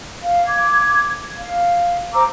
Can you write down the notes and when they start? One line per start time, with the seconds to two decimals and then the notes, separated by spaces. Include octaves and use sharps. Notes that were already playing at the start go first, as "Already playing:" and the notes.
0.22 F5
0.47 D6 G#6
1.36 F5
2.13 C5 A#5 D6 E6